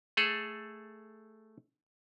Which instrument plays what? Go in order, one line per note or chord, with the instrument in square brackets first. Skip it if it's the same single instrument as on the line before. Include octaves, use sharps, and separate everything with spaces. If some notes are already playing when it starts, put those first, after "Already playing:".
[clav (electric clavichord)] A3 G#4 A4